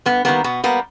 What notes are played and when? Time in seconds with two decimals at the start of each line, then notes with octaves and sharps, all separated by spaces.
0.06 G2 B3
0.25 D#3 G3 A#3 B3
0.44 B2 B3
0.64 G3 A#3 B3